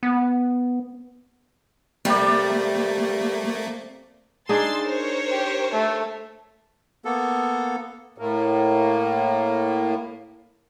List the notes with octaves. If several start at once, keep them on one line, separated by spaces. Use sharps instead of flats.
B3
C3 G3 A3 A#3 D5
D4 D#4 G#4 C6 E6 A6
A#4 C5 C#5
G4
A3
A#3 B3 A4
A2 A#3